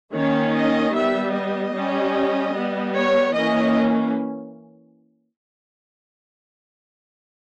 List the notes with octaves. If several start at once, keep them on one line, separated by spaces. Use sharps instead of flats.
D#3 A#3 C#4 C#5
D#5
G3 B3 E5
D#5
G3 C#4
G3 B3
C#5
E3 A#3 C#4 D#5